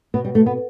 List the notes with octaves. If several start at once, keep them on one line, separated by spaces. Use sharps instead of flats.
B2 B3
G3
A3
B3